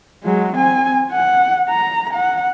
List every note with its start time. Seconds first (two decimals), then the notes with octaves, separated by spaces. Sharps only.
0.24 F#3 G#3
0.54 C4 G#5
1.12 F#5
1.69 A#5
2.14 F#5